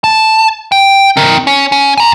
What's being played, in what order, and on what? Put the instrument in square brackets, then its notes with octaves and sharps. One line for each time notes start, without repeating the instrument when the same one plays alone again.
[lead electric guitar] A5
G5
C4 A#4
C#4
C#4
G#5 A#5